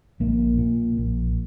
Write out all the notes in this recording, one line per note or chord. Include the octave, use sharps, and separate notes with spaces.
A#1 A#3
A#2
A#1